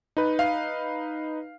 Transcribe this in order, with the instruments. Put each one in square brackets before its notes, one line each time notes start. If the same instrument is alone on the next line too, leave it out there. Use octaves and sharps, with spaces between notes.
[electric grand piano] D#4 B4
[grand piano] F5